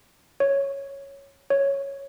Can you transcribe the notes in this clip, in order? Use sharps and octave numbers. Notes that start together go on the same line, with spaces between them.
C#5
C#5